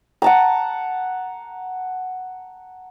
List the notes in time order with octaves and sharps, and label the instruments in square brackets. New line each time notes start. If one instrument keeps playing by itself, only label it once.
[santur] F#5 A5 A#5